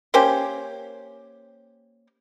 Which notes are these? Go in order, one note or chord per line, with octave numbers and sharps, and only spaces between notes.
A#3 C#4 G4 C5